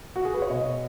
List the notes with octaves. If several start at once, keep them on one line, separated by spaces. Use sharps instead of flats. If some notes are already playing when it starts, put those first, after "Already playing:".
F#4
G#4
B4
C#5
B2 D#5